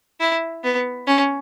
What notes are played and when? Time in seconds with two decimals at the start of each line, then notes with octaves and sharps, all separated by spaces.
0.20 E4
0.64 B3
1.07 C#4